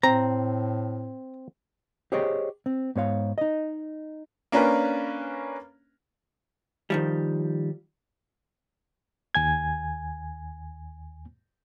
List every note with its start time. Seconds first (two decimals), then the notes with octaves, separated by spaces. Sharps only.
0.03 A2 C4 A#5
2.12 G4 G#4 C5 C#5 D#5 G5
2.66 C4
2.96 G#2 B3 C#5 F5
3.38 D#4 D#5
4.52 A#3 C#4 D4 A#4 B4
6.90 D#3 F3 G3
9.35 D#2 G#5 G#6